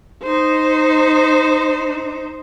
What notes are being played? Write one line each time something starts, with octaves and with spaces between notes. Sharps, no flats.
D#4 C5